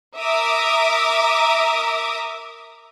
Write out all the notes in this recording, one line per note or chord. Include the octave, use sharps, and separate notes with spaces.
A#4 E5 D6 D#6